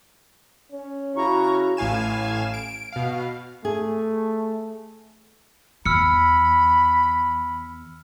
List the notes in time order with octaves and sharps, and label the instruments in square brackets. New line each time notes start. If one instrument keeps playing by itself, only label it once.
[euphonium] C#4
[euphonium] C#3 [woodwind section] E4 F#4 [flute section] A#5 C#6 F6
[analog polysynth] A1 A2 F5 G#5 E7
D7
B2 F5
[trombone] A3 [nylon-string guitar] G#4
[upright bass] E2 [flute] B5 [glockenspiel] E6 F6 C#7